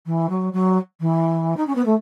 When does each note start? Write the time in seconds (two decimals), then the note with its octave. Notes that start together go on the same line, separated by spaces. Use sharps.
0.06 E3
0.29 F#3
0.53 F#3
1.00 E3
1.56 D#4
1.66 C#4
1.75 B3
1.85 A3